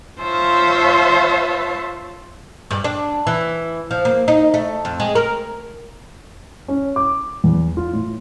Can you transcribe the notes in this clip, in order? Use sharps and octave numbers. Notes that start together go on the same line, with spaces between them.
F4 C5 C#5 E5 F5 A5
G2
D4
E3
F3
A#3
D#4
A3
F2
G#3
A#4
C#4
D6
E2
F4
A2